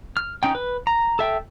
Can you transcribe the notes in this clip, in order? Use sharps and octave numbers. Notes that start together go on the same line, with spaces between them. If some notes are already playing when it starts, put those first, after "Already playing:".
F6
C#4 D#4 G5
B4
A#5
A4 E5 G5